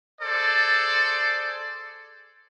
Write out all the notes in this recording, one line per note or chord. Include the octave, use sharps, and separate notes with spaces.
G#4 A4 C5 D5